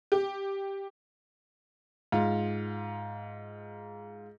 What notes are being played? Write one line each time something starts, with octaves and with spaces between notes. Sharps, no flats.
G4
G#2 F4